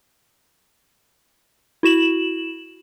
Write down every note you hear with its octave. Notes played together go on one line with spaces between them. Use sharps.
E4 F#4 E7 F#7